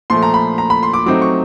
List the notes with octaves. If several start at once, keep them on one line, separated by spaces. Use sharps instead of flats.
A#2 F3 A3 C6
A#5
B5
A#5
B5
C6
D6
F#3 A3 C4 D#4 D6
C#6